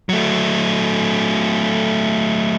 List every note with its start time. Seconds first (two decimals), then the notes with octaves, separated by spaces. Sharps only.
0.09 F#3 A3